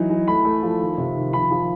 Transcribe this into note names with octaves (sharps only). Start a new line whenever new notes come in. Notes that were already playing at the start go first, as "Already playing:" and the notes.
Already playing: E3 F#3 D#4
E3
A3 B5
A3
F3
D#3
C3
D#3
F3 B5
F3